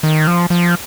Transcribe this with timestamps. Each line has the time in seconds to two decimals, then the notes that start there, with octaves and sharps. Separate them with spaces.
0.03 D#3
0.27 F3
0.50 F3